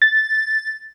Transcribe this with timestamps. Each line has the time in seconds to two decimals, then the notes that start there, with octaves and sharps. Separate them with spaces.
0.02 A6